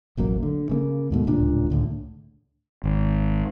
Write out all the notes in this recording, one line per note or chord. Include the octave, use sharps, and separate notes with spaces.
E1 A1 F#3 A#3
D3
C#3 A3 A#3
D#2 G#2 B2 A3
D1 C#2 A#2 D4
C#2 A2 D3
G#1